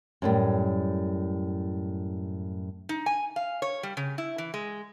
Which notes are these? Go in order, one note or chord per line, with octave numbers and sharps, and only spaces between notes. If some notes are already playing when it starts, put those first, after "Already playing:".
F#2 A2 G3
D#4
G#5
F5
C#5
G3
C#3
E4
E3
G#3